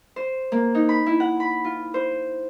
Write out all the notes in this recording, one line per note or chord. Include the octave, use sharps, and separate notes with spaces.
C5
A#3
D#4
B5
E4
F#5
B5
F4
C5